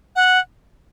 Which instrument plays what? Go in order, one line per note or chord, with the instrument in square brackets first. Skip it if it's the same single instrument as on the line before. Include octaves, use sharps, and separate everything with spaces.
[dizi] F#5